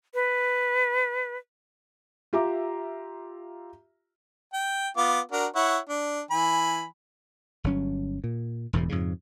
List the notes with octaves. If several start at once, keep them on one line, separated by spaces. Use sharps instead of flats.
B4
F4 G4 E5 A#5 D6
G5
B3 F4 D6
D4 F#4 A#4
E4 C#5 F#5
D4
E3 G#5 B5
G1 F#3 C#4
A#2
E1 E2 A2 C3
F2 G#2 C#3